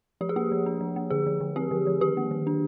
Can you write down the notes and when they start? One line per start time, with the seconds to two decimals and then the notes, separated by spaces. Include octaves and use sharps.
0.21 F3 G4
0.29 G#4
0.36 A#3 G4
0.51 F3
0.66 D4
0.81 F3
0.96 A#3
1.10 D3 G#4
1.27 F3
1.41 D3
1.56 C4 G4
1.71 D3
1.86 F3
2.01 D#3 G4
2.17 A#3
2.31 D#3
2.47 D4